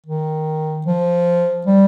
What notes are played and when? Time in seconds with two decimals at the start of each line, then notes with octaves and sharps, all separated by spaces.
0.07 D#3
0.86 F3
1.67 G3